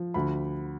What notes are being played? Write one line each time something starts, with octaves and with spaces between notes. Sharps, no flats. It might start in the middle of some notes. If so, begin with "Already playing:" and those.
Already playing: F3
D2 B5